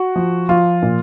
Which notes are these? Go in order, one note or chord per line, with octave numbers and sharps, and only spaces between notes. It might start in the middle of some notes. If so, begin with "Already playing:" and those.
Already playing: F#4
F3
F3 F4
A#2